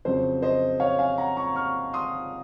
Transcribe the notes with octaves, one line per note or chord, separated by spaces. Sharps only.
F2 C#3 F#3 C5
C5 D#5
C#5 F5
F5 G#5
F#5 A#5
A#5 C#6
C#6 F6
C6 D#6